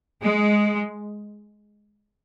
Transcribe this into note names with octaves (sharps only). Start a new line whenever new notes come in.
G#3